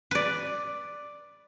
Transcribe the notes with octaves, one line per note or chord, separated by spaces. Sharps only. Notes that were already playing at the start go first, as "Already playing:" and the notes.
B4 D5